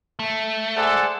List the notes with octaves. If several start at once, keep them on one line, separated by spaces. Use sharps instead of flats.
A3
G#4 A4 C5 D5 F#5